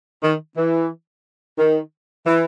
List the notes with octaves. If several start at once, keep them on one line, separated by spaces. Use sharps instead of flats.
D#3
E3
D#3
E3